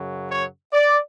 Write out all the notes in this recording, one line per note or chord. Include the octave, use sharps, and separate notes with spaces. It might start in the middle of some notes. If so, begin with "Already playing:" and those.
Already playing: F#2 C#3 F#3
C#5
D5